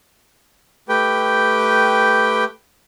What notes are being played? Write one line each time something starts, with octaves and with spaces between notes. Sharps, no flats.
A3 G4 B4 G5